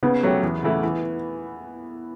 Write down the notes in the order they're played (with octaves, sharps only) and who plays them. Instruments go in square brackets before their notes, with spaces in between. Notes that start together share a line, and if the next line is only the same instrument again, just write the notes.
[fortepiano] C#3 [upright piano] B3
[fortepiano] F#3 A3 C#4 G4
E2
C#3 E3 A3 E4
E3